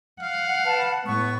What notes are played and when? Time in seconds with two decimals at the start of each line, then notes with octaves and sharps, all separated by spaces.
0.22 F5 F#5
0.65 B4 A5
1.05 A2 B3 C#6